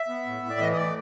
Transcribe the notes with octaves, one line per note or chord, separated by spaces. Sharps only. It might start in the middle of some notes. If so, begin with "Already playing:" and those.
Already playing: E5
B3
A2
A2
D5
E3 D#5
D#5
A2 D5